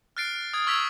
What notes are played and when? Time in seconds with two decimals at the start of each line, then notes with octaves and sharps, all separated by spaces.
0.17 F6 F#6 A6 C7 D7
0.53 D#6 G#6
0.67 C#6 E6 G#6 B6 F7 F#7